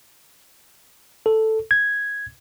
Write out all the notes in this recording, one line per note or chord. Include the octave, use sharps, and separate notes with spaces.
A4
G#6